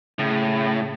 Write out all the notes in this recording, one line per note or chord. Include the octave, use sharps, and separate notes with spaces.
A2 C#3